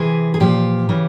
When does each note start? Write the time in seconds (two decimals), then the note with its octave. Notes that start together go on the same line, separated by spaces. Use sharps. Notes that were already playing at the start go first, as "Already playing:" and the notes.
Already playing: C3 E3 G#4
0.34 G#4
0.40 A#2 F3 G4
0.89 C#3 E3